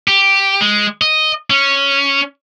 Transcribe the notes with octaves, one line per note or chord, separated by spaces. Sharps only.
G4
G#3
D#5
C#4